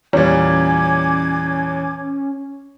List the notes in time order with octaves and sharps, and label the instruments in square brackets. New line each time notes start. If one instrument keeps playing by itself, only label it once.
[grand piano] E2 A#2 G3 [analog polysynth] C#4 [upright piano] C#5 [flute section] G#5 D6 G#6